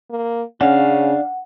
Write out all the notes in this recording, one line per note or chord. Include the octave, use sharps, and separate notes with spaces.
A#3
C#3 C#4 D4 F5 F#5